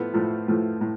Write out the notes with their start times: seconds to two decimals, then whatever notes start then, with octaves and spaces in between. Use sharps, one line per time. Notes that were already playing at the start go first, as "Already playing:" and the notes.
Already playing: A2 F3 A3 B3
0.14 A2 F3 A3
0.48 A2 F3 A3
0.81 A2